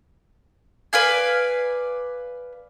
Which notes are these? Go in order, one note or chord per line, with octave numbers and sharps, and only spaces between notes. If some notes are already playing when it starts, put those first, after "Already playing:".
B4 D5 F5 G#5